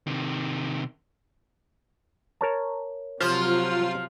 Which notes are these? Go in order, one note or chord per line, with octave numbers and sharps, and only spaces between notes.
C3 D#3
A#4 C#5 A5
C3 F3 F#3 F4 C5